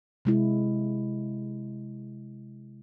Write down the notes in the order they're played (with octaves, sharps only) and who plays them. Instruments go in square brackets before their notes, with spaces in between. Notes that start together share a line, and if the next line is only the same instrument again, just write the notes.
[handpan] C3 G#3 E4